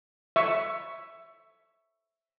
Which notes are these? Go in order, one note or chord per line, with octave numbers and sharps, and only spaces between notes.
E5 C#6